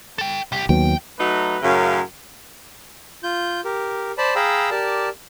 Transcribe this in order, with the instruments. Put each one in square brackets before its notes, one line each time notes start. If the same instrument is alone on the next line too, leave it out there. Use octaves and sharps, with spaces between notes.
[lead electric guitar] A4 G5
C2 G4
[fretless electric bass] D#2 F#3 B3 [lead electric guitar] G5
[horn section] F#3 A3 D#4 B4
F#2 A2 C#3 A#4 F5
[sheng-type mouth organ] F4 G6
G4 A#4
C5 D5 A5 B5
G#4 F5 G5 A#5 B5 E6
G4 A#4 D5 A5